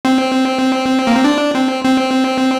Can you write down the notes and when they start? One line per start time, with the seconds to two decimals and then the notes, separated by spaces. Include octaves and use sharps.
0.05 C4
1.07 A#3
1.16 C4
1.24 D4
1.55 C4
1.84 C4